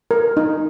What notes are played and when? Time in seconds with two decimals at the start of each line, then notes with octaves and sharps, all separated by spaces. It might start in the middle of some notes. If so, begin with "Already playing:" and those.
0.11 A#4
0.37 D#4